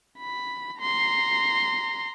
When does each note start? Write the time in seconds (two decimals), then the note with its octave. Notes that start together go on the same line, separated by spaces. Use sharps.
0.18 B5
0.81 A#5 C6